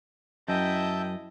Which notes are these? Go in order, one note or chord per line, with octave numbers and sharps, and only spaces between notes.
F#2 E4 D#5 E5 G5 A5 G6